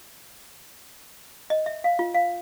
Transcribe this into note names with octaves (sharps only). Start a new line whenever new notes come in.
D#5
E5
F5
F4
F5